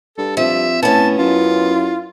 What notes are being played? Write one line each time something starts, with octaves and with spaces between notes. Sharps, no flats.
G2 A4
F3 C4 E5
A2 B3 C#4 A5
F#2 E4 F4